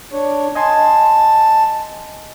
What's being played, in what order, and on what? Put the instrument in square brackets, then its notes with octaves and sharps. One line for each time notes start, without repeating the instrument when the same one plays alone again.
[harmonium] D4 C#5
[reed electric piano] D#5 G#5 C6 [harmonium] A5